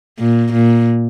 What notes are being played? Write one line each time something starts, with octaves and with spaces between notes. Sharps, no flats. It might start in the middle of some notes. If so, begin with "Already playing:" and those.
A#2
A#2